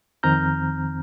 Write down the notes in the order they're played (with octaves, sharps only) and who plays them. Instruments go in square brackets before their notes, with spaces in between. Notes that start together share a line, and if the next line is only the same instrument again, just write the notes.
[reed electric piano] F2 D#3 C4 A#5 F6 G6